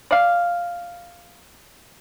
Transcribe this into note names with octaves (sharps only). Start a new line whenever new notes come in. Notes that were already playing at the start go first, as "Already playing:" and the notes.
D5 F5